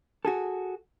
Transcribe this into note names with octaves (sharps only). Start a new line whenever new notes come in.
F#4 G#4 A4